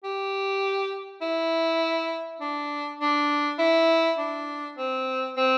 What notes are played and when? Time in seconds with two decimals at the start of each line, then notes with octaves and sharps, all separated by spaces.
0.04 G4
1.22 E4
2.41 D4
3.00 D4
3.59 E4
4.18 D4
4.78 C4
5.37 C4